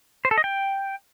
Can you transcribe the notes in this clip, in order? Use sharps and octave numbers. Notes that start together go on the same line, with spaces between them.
C5
A4
D#5
G5